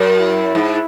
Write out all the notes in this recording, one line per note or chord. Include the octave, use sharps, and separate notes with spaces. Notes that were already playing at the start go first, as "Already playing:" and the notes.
Already playing: F#2
E4
G#2